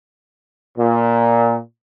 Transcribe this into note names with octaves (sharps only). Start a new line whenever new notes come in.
A#2